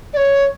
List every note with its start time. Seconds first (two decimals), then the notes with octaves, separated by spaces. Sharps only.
0.13 D5
0.17 C#5